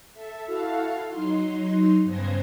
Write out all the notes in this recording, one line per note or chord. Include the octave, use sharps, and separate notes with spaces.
A4 E5
E4 F#4 A4 F5
F#3 D#4 C6
G2 C#3 B3 C5 G#6 A#6